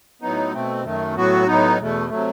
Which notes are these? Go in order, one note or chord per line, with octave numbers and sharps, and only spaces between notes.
A2 F#3 B3 D#4
B2 A3 C4
F#2 D#3 A3
A2 F#3 B3 F#4
A2 F#3 B3 D#4
E2 B2 A3
C3 F#3 A3